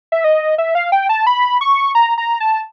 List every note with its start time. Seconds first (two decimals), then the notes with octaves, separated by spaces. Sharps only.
0.12 E5
0.24 D#5
0.58 E5
0.75 F5
0.92 G5
1.09 A5
1.27 B5
1.61 C#6
1.95 A#5
2.18 A#5
2.40 A5